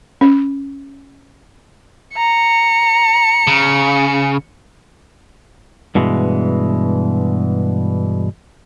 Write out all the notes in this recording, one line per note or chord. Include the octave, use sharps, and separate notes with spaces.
C#4
A#5 C#7
C#3
G2 B2 E3 G#3